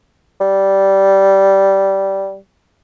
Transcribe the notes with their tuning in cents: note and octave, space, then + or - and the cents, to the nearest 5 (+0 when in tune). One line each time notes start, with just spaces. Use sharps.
G3 -10